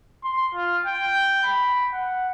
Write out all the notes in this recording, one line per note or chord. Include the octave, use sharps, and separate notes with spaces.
C6
F4
G5
B5
F#5